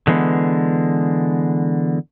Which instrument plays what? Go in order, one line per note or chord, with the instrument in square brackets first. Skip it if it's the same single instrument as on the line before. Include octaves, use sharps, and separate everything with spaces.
[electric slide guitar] D3 E3 G#3 B3